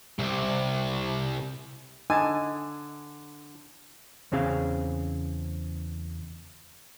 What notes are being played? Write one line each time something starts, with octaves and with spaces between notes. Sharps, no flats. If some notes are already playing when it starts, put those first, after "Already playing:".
C2 C3
D3 D#4 G#5 A5
E2 C#3 C4 G#4 F5